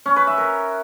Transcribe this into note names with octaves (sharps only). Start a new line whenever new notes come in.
C#4
B4
E5
A#4